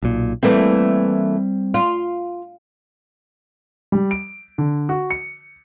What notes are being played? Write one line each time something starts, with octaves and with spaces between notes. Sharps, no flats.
B1 A#2
E3 G3 A3 A#3 C4
F4
G3
D7
D3
F#4
C#7